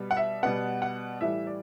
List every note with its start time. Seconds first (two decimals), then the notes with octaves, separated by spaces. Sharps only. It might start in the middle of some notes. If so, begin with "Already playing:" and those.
Already playing: B2 G3 B3
0.11 F#5
0.17 E5
0.43 B2 G3 B3 F#5
0.82 F#5
1.21 A2 E3 G3 E5
1.47 D5